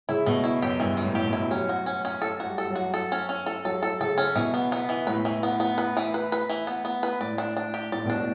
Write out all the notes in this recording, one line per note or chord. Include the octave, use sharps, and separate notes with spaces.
C#3 E4
B2 A3
E4
F#2 G4
G2 E3
E3
A2
G4
B2
E4
F#3 C#4
F#4
C#4
C#4
A4
F#4
G3
A4
F#3
F#4
A4
C#4
C#4
A4
F#3 A4
A4
C#3 A4
C#4
B2 E3
B3
B3
E3
A2 B4
E3
B3
B3
B4
E3
B4
B4
E3
B3
B3
B4
A2 D5
D4
D4
G4
A2 D5
B2 D4
A2